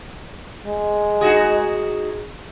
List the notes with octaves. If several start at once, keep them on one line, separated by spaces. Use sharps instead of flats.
G#3
D#4 F#4 G#4